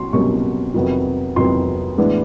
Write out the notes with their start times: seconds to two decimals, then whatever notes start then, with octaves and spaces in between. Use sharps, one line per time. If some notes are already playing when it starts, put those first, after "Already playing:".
Already playing: C2 B2 F#3 C#4 C6 C#6
0.13 C2 B2 F#3 A#3 C#4 C#6
0.74 F2 C3 D#3 F#3 B3
1.36 F2 C3 D#3 F#3 B3 C6
1.98 A2 E3 G#3 B3 D4